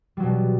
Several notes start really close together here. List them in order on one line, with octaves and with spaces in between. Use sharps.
G3 F#3 B2